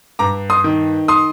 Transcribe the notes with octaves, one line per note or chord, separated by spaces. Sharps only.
G2 A#5 D6
C6 D#6
D#3
C6 D#6